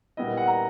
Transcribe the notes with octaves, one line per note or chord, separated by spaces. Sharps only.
A#2 G3 B3 E4 D#5
F#5
A#5